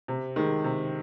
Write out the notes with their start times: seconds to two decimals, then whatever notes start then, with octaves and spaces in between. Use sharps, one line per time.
0.08 C3
0.36 D#3 G#3
0.64 C3